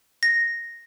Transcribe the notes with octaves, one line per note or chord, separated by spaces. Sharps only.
A#6